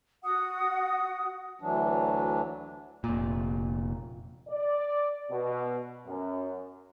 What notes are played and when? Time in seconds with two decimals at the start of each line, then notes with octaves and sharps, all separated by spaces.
0.23 F#4 F#5 D#6
1.61 D2 E3 F#3 D4
3.04 F1 A#2
4.48 D5
5.31 B2
6.06 F#2